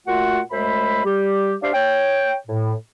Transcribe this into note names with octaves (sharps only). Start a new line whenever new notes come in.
A#2 A3 F4 F#4 F#5
F#2 G#3 A3 C5 E5 B5
G3 G4
D4 G4 C5 E5 F5
C#5 G5
A2